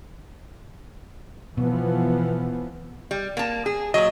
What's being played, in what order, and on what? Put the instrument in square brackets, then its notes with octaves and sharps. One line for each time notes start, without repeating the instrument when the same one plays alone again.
[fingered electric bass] B2 [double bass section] E3 F3 B3
[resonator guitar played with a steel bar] G3
A#3 A5
G#4
[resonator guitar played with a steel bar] A#2 F#3 [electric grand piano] D#5